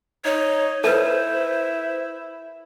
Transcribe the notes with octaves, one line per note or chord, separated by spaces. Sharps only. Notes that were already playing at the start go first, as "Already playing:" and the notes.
D#4 C#5
E4 A4 B4 C5